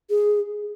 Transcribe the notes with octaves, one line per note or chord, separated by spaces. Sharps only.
G#4